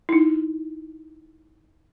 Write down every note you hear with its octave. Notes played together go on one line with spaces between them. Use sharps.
D#4 E4